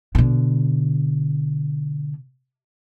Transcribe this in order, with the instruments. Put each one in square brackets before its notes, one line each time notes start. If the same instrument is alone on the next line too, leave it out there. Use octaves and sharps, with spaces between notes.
[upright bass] B2 D3